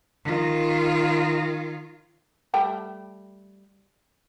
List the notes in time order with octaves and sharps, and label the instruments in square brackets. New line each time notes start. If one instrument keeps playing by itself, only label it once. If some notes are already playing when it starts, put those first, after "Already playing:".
[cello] D#3 F4
[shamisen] G3 A3 G5